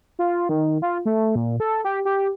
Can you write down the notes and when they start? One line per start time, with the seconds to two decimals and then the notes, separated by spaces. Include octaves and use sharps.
0.19 F4
0.49 D#3
0.82 F4
1.06 A3
1.35 A#2
1.60 A4
1.84 G4
2.05 G4